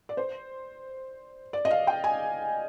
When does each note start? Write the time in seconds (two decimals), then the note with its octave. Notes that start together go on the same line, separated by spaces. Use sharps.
0.09 D5
0.17 C5
1.53 D5
1.65 D#5
1.71 F5
1.87 G5
2.04 G#5